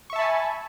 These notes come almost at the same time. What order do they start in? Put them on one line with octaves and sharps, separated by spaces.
C#6 E5 A5 B5 G#5